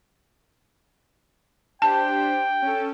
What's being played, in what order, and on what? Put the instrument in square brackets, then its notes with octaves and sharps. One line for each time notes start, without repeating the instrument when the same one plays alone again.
[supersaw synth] D4 G4 C5 [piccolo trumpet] G5 [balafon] A5
[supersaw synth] C#4 A4